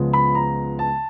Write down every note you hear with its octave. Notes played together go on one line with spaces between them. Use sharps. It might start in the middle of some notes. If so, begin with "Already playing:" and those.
Already playing: C#2 C#3 F3 G#3 B3
B5
A#5
A5